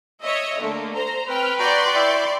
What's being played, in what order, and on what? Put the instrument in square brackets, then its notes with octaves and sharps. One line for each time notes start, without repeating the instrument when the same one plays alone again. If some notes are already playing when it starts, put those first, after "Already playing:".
[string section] C#5 D#5 E5
D3 A3 A#3
C5 A#5
[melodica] C4 [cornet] B4 [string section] G5 F6
[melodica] F#4 G5 A#5 [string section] D5 C6 C#6
[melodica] E4 E5 G5